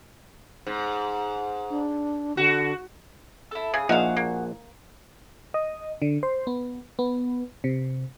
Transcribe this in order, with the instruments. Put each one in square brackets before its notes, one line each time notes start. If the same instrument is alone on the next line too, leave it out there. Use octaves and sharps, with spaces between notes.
[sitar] G#2
[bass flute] D4
[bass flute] D3 [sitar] F#4
[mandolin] E4 A4
[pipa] C#3 [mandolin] G#4
[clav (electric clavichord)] A#1 A#2 E5 [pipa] D#4 F5 [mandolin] F#4 G#4
[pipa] A#3
[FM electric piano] D#5
D3
C5
B3
B3
C3